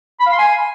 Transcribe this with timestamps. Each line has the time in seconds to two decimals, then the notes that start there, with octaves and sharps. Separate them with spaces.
0.20 B5
0.26 F5
0.32 C6
0.39 G#5